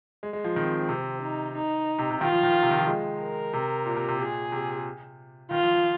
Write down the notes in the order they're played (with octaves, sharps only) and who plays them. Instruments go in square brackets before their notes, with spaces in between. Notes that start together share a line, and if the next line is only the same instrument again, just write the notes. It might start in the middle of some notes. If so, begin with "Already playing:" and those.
[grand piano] G#3
G#3
F3
[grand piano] D#3 [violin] C4
[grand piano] C3
[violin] D#4
D#4
[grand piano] C3
C3
[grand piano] D#3 [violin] F4
[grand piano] F3
D#3
C3
D#3
F3
G#3
[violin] A#4
[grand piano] C3
A#2
C3
C3
[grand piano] A#2 [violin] G#4
[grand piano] C3
[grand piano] D#3 [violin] F4
[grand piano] F3
F3